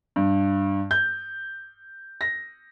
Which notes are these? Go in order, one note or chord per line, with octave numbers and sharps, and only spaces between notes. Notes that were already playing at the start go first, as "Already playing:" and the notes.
G2
G6
A#6